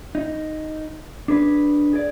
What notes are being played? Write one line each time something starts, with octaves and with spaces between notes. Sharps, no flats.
D#4
D4 G#4 B4
G#4 D5